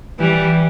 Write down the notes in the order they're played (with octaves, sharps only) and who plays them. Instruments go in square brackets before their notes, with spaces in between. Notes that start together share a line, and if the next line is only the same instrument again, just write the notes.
[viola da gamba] E3 G3